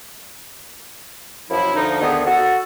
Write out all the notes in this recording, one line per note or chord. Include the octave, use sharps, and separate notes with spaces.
F#2 F3 E4
D2 F3 D#4
D2 D3 D#3 B3 D#4 G#4
F#4 A4